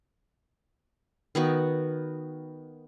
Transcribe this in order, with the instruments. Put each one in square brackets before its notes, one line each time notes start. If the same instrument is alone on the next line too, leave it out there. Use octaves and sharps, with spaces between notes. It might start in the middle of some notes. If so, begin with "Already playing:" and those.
[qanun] D#3 B3 F#4